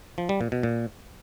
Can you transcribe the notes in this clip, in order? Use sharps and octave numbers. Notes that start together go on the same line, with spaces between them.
F3
G3
A#2
B2
A#2